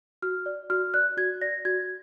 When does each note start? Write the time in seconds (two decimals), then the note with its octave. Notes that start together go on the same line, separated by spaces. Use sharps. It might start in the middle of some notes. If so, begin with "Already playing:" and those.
0.22 F#4 F6
0.46 D5
0.70 F#4 F6
0.94 D5 F#6
1.17 F#4 G#6
1.42 D5 A#6
1.65 F#4 G#6